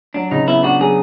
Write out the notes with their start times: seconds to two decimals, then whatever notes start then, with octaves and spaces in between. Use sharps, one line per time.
0.14 F#3 D4
0.31 C#3 D#4
0.47 B3 E4
0.63 D4 F#4
0.80 F#3 G#4